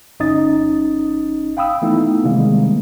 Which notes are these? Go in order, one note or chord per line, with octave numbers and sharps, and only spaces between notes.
G1 C#4 D#4 D#5 D#6 A6
F5 G5 B5 D#6 E6
E3 A3 B3 D#4 E4
C3 D#3 G3 G#3 A#3 C4